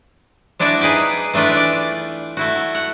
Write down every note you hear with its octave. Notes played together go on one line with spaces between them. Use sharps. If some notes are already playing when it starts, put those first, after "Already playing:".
G#3 D4 E4 F#4 D5 E5
D#4 G#4 B4 D5 G5
E3 A3 D4 F4 B4
D5
A3 E4 F#4
F#5